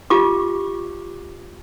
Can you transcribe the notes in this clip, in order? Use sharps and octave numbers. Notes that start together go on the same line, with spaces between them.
F4 G4 D6